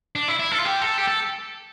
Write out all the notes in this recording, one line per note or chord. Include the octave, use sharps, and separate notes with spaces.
D4
E4
E4
A4
F4
G4
A4
G4
A4